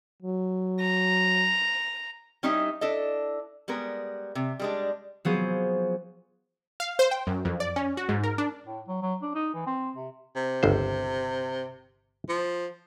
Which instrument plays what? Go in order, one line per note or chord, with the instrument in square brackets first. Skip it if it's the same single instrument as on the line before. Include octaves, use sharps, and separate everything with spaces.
[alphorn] F#3
[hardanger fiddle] A#5
[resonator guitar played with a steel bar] G3 C#4 D#4 E4 G4 D#5
D4 E4 A4 D#5
G3 G#3 B3 A#4
C3
G3 G#3 D4
[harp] F3 F#3 B3 G#4 C5
[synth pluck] F5
C5
G5
F#2
F2
D5
C#4
F#4
G#2
A#4
D4
[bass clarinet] A2
F#3
F#3
D4
D#4
E3
C4
C3
[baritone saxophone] C3
[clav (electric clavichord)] G1 C#2 C5
[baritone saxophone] F3